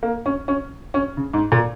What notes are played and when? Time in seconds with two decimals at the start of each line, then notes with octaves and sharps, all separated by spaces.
0.03 A#3
0.26 C#4
0.48 C#4
0.94 C#4
1.17 C#3
1.34 G#2
1.52 A#2